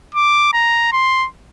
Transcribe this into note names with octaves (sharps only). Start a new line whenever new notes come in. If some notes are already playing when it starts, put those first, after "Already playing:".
D6
A#5
C6